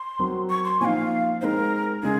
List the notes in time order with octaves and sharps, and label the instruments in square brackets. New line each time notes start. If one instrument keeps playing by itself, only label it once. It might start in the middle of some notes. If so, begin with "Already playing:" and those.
Already playing: [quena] C6
[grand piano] F#3 C4 F#4 A#4
[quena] C#6
C6
[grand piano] A#2 F3 C4 D#4 [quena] F5 G#5
[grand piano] G#3 C4 D#4 [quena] A#4 C5
[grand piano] C#3 G#3 [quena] G#4